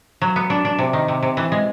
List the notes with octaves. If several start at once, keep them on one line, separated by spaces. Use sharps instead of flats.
F#3
B3
D4
D4
C3
D#3
C3
C3
E3
G#3